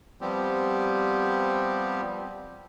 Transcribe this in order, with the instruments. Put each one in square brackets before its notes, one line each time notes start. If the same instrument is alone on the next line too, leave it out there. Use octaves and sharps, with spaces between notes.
[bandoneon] F3 G3 B3 C4 G4